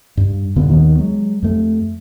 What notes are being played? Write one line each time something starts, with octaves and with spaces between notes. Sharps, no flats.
G2
F2 A#2 D3 B3
D#2 D#3 B3
F#3 G#3
F2 A3